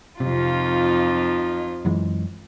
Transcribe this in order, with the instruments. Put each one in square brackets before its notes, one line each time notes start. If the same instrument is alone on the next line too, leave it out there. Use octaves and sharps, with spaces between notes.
[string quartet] F2 D#4 F4 [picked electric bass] C3
[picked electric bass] F#2 E3 G#3